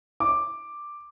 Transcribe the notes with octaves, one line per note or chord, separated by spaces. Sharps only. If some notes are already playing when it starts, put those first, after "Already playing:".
D6